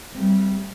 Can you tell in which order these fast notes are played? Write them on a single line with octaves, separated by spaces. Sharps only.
C4 A3 G3